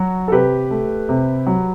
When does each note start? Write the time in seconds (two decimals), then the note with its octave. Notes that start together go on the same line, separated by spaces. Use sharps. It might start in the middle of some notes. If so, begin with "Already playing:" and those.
Already playing: F#3 F#4
0.28 A4
0.32 C3 G4 B4
0.71 A3
1.09 C3
1.46 F#3